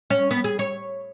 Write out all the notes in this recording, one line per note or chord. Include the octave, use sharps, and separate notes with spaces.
C#4
B3
G#4
C#5